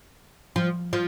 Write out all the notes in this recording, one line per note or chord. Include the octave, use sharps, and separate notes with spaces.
F3
F3